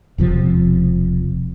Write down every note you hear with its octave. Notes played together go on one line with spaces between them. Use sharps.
E1 C3 F3